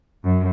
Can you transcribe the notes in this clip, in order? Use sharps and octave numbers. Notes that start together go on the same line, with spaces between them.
F#2